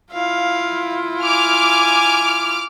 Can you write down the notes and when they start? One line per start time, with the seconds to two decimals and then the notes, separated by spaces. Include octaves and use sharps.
0.13 E4 F4 F5
1.22 G#5 D6 F6